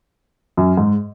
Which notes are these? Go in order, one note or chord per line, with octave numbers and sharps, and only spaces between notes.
F#2
G#2